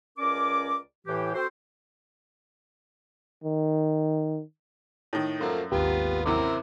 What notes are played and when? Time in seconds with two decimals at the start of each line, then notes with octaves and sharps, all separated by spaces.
0.18 C#2 C#4 A#4 D5 D6
1.07 A2 E3 G4
1.35 C4 F#4 A4 C5
3.44 D#3
5.13 A2 D#3
5.41 F#2 F3 A3 A#3
5.72 G#1 D#2 B3 F4 G4
6.26 F#2 C3 E3 E4 A#4 C5 D6